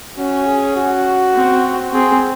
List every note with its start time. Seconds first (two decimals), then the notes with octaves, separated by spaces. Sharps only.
0.17 C#4 F#4
0.46 G#4
0.76 F#4
1.34 C4
1.93 C4 G#4